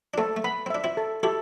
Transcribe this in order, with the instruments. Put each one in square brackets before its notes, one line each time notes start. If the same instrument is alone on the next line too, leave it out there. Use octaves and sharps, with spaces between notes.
[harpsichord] D4
[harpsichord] A3 C4 [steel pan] A4
[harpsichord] A3
[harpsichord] B3 [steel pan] B5
[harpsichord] C4
[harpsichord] D4 [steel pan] E5
[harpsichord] C4 E4
[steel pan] A4
[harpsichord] E4 G4 [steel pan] A4